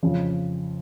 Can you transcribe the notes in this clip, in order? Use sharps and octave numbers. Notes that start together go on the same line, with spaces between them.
F2 C#3 F3